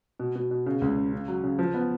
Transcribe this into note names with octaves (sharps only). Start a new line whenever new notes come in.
B2
B2
B2
C#3
C#2
C#3
C#3
F#3
C#3
F3
B3